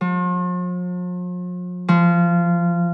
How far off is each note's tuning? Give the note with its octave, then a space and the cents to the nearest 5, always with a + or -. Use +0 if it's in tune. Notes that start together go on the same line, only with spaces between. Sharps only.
F3 +45
F3 -20